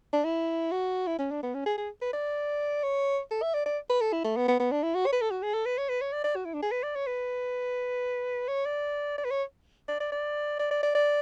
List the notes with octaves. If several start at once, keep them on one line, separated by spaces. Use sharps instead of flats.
D4
E4
F#4
E4
C#4
D4
B3
C#4
G#4
G#4
B4
D5
C#5
A4
E5
D5
D5
B4
A4
E4
A3
B3
B3
B3
D4
E4
F#4
C#5
B4
A4
F#4
G#4
A4
B4
C#5
B4
C#5
D5
D5
F#4
E4
D4
G#4
B4
D5
C#5
B4
C#5
D5
D5
B4
C#5
D5
D5
D5
D5
D5
D5
D5